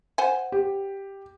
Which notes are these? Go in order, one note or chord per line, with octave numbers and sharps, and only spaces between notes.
C5 F#5 G#5
G4